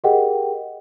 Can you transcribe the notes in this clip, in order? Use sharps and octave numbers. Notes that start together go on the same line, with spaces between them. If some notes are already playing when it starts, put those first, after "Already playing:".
G4 G#4 A#4 D#5 F#5 G5